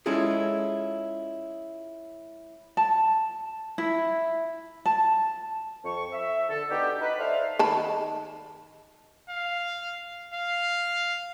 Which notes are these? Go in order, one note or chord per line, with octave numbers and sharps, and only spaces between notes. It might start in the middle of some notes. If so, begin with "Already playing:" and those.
G#3 C#4 E4 F4 G#4 A4
A5
E4
A5
F2 C#6
E5
D3 A4
B3 D4 D#4 F#4 G4
D#4 B4
A4 C5 D5 E5 F5
D#3 A5 B5
F5
F5